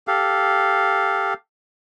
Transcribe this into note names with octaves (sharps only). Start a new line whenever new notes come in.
G4 A4 F5